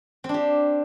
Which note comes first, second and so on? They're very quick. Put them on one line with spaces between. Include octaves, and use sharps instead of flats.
C4 D4 G4